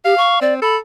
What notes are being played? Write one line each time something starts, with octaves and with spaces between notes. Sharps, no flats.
G4 F5
C#6
C4 D5
A4 B5